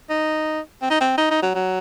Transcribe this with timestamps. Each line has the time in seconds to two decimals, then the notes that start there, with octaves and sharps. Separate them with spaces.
0.10 D#4
0.82 C4
0.90 D#4
1.01 C4
1.18 D#4
1.31 D#4
1.43 F#3
1.55 F#3